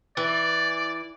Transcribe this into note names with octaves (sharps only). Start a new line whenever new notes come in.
E3 D5